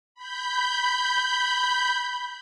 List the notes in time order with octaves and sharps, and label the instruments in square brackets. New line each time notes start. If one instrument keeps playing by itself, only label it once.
[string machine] B5 G6